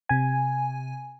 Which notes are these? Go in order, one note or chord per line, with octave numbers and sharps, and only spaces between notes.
C3 G#5